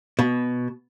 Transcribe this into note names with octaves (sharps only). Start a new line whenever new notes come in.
B2